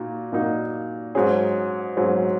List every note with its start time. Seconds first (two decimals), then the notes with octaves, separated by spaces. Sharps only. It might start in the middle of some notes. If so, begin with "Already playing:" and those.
Already playing: A#2 A#3 D#4 F#4
0.32 A#2 A#3 D#4 F#4
1.15 G#2 F#3 C#4 G#4
1.97 G#2 F#3 C#4 G#4